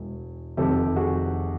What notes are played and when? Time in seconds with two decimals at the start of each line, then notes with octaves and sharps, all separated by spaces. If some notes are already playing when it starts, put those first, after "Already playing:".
Already playing: E1
0.57 F1 F2 C3 D#3 G4 A4
0.96 F#4 G#4